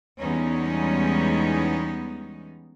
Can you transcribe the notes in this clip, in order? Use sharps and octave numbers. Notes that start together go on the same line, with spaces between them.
E2 G3 G#3 B3 C#4 D#4